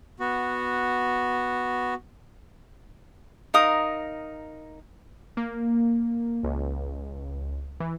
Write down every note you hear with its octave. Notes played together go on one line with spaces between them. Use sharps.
B3 F#4
D#4 A#4 F5 D#6
A#3
C#2
E3